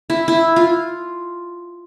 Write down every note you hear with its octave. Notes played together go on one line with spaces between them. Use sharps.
E4
E4
F4